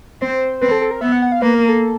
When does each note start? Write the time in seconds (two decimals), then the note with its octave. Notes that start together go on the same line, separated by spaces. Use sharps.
0.22 C4 C5
0.61 C4 B4
0.71 A4
0.81 A4
0.91 A#4
1.01 B3 E5
1.12 F#5
1.22 F#5
1.32 F5
1.41 A#3 B4
1.54 A#4
1.69 A4